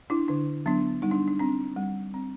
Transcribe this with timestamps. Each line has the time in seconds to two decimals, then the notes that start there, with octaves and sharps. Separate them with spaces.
0.10 D4 E4
0.28 D3 D4
0.66 F#3 B3 D4
1.02 G3 D#4
1.11 D4
1.28 D4
1.40 C4 D4
1.76 G3
2.14 C4